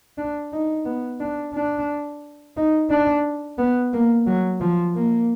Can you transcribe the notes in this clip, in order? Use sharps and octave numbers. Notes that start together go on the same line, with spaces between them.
D4
D#4
B3
D4
D4
D#4
D4
B3
A#3
F#3
F3
A#3